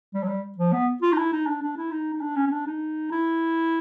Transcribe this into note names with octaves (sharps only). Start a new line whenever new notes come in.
G3
F#3
G3
F3
B3
F4
D#4
E4
D#4
D4
D4
E4
D#4
D#4
D4
C#4
C#4
D4
D#4
E4